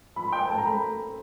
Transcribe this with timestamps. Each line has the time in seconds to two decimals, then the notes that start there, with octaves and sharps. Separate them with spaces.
0.16 F3 B5
0.25 C6
0.32 F3 G5
0.41 G#5
0.49 A3 A5
0.58 A#5
0.66 A3 B5